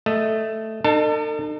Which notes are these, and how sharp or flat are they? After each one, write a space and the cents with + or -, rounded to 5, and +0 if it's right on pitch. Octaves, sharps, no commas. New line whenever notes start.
A3 +0 D#5 +0
D#4 -40 A4 +40 A5 +0